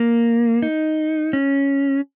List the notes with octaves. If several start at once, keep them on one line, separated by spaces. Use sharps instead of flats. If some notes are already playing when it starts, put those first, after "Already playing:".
Already playing: A#3
D#4
C#4